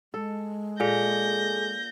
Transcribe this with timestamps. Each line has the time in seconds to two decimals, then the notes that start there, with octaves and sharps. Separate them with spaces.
0.14 G#3 A4
0.80 A#2 G#4 A4 G#5 G6 A#6